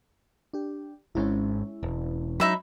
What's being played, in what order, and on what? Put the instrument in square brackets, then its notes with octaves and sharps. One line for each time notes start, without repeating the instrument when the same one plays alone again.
[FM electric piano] D4 G4
[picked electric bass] G#1 G#2 [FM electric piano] G#3 C#4 E4
[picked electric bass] E1
[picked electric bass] F#3 [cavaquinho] D#4 E5 B5